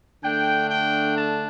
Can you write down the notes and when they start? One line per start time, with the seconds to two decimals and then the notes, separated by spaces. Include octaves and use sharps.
0.23 D3 A3 D4 G5
0.70 G5
1.16 A5